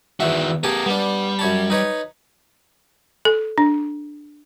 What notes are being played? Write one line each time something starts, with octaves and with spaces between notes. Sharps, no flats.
E2 D#3 F#4 E5
B3 G4 G#4 A#4 A5
G3 B3 D4
F#2 C#5 A5
D#4 B4 C#5
A4
D4